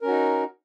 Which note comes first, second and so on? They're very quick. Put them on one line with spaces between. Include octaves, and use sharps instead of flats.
A#4 C#4 F#4 D#4